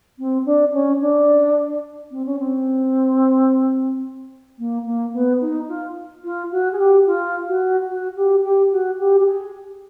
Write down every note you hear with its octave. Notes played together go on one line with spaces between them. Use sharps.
C4
D4
C#4
D4
C4
C#4
C4
A#3
A#3
B3
D#4
F4
F4
F#4
G#4
G4
F4
F#4
F#4
G4
G4
F#4
G4
G4
G#4